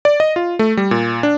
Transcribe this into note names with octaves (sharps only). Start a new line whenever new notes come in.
D5
D#5
F4
A3
G3
A#2
D4